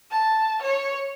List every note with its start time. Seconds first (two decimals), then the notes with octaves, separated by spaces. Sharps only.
0.11 A5
0.62 C#5